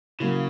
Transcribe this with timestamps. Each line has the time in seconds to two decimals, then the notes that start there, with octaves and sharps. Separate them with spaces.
0.20 C#3 F#3 A#3 E4